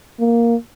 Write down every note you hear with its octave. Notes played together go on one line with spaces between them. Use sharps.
A#3